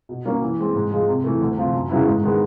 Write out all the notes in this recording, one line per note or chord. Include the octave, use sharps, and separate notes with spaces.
B2
F#3 A#3 C#4
E3
G#3 C4
G#2
F3 G#3
C3
E3 A3
D2
C3 F3
F#2
C#3 F#3 B3 E4
G#2
D#3 G#3 B3